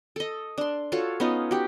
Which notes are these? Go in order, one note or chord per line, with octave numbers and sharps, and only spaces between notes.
A4 D#5
D4 C6
F4 F#4 A4 C#5
B3 C#4 D#4 F4
F#4 G4